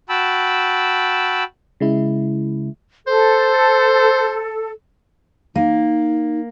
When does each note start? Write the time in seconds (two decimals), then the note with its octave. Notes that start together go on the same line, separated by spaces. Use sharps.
0.09 F#4 G5 A5 B5 E6
1.80 C#3 G#3 E4
3.07 A4 C5
5.56 A#3 D#4